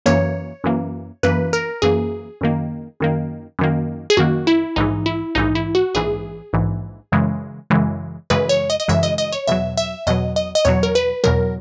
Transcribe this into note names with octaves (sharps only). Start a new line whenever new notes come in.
F#2 E3 A#3 C#5
F#2 E3 A#3
F#2 E3 A#3 B4
A#4
F#2 E3 A#3 G#4
F#2 D#3 A#3
F#2 D#3 A#3
F#2 D#3 A#3
G#4
F#2 D#3 A#3 F#4
E4
A#1 G#2 E3 D#4
E4
A#1 G#2 E3 D#4
E4
F#4
A#1 G#2 E3 G#4
A#1 G#2 E3
F#2 C#3 E3 G#3
F#2 C#3 E3 G#3
F#2 C#3 E3 G#3 B4
C#5
D#5
D#5
F#2 C#3 E3 G#3 E5
D#5
D#5
C#5
E2 B2 F#3 E5
E5
E2 B2 F#3 D#5
D#5
D#5
E2 B2 F#3 C#5
A#4
B4
E2 B2 F#3 A#4